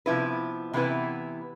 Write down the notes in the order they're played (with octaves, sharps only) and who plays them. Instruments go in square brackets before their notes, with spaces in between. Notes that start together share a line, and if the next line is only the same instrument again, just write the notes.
[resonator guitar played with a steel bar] C3 F3 B3 E4 B4
C3 E3 B3 E4 B4